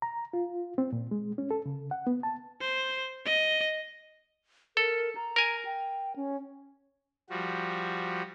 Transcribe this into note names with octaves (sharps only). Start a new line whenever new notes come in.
A#5
F4
C4
A#2
G#3
C#4
A4
C#3
F#5
B3
A5
C5
D#5
A4 A#4
A#5
A#4 G#5
G5
C#4
F3 G3 F#4